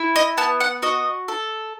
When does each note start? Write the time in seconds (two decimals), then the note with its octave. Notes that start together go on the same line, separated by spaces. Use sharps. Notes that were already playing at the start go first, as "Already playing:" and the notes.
Already playing: E4
0.16 D#5
0.37 B3 A5
0.60 F#5
0.82 F#4 D#5
1.28 A4